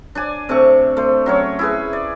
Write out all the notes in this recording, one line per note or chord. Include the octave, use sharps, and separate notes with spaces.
D4 D5 G#5
C3 A3 D4 C#6
A3 C5
F#3 C#4 C#5
E4 G#4 B4
D5